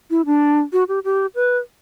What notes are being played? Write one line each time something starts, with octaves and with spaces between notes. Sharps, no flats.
E4
D4
F#4
G4
G4
B4